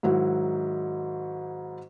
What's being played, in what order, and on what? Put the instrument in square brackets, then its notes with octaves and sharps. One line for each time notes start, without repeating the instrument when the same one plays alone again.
[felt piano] G#2 D#3 F#3 E4 F#4